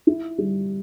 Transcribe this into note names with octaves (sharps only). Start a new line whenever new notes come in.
E4
G3